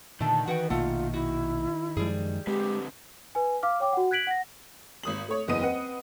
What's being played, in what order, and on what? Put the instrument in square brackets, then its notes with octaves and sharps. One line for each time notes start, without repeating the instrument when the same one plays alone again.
[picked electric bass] A#2 D3 [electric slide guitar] D#3 [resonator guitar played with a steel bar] A3 D4
[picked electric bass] E3 [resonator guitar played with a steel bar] F#4 F#5 G5 [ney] B4
[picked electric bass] A#1 B2 A#3 [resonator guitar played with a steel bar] A3 F#5 [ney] F4
[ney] E4 [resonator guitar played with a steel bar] F#4
[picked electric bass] F#2 F3 G#3 [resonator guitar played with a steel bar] G3 G#4
[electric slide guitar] D3 C4 B4 [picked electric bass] G#3 [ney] G4
[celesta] B4 G#5
F5 D6 F6
C#5 G5 D6
F#4 F#5
F#6 G#6 B6 D7 F#7
F#5 A#6
[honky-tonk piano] G#1 D#6 F#7
A3 C#5
F#1 E2 B3 D#5 D#6 D#7
C4 B4 D#5 F#5